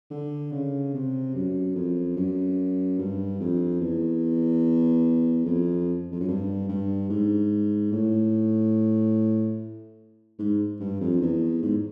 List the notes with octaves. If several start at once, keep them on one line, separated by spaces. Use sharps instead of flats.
D3
C#3
C3
F#2
F2
F#2
G2
F2
E2
F2
F2
F#2
G2
G2
G#2
A2
G#2
G2
F2
E2
G#2